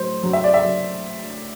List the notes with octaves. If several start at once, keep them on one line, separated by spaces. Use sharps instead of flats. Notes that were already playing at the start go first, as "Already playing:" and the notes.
Already playing: A2 F#3 C5
F#3
E5
D5
E5
F#3